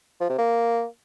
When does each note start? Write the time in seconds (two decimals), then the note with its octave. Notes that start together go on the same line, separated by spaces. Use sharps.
0.20 F3
0.29 C3
0.38 A#3